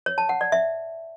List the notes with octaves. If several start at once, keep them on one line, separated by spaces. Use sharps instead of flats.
C#5
A5
F#5
D5
E5